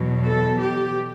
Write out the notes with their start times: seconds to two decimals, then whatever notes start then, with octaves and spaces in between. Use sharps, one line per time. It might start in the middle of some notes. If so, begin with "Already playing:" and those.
Already playing: E2 B2 F#3
0.26 A4
0.60 G4